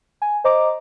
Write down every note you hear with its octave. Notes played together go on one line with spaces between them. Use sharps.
G#5
C5 D#5 A#5 D6